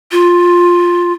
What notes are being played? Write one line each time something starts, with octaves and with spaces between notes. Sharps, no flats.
F4